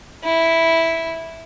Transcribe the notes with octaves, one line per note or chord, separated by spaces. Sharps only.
E4